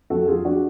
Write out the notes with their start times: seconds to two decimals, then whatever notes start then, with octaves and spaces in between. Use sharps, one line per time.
0.10 F2 F#4 A4
0.28 F2 F4 G#4
0.45 F3 D4 F#4